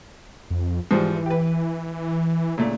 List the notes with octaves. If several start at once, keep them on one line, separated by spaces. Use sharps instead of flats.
F2
G#2 E3 F3 G3
G4 B4
A#2 C#3 A3 D4